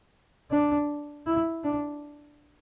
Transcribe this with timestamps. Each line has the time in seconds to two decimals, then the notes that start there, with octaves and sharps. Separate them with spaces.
0.51 D4
1.26 E4
1.64 D4